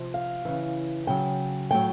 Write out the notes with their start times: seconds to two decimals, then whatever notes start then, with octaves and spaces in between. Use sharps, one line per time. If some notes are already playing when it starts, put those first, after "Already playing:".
Already playing: C3 F3
0.14 F5
0.45 C#3 E3
1.07 C#3 F#3 G5
1.71 A2 F#3 G5